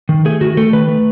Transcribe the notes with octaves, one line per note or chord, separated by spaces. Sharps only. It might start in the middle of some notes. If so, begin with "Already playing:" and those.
D#3
A3 G#4
D#3 F#4
A3 A4
D#3 B4
A3